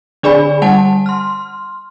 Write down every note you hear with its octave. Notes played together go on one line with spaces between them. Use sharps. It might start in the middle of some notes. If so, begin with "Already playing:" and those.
D3 D4 G#4 D5 G#5 B5
G3 F#5 G#5 A5
C6 F6